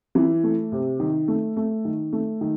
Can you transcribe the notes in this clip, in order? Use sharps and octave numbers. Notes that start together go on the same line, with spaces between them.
E3
A3
C3
D#3
A3
A3
D#3
A3
D#3